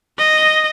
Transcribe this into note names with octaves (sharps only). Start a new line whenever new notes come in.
D#5